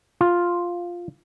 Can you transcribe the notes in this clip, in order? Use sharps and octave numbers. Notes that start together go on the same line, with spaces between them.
F4